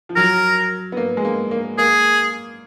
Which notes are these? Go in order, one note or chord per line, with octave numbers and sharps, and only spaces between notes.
F3
F#3 A#4
B3
A#3
G#3
A#3
A#3
A#3 G#4